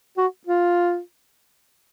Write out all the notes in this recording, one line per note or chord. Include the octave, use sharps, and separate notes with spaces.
F#4
F4